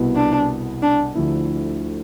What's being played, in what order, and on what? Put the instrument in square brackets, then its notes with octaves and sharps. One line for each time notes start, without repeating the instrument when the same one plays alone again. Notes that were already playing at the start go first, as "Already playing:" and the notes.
Already playing: [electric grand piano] C2 B2 B3 E4
[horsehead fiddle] D4
D4
[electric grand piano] D2 D3 F3 A3 E4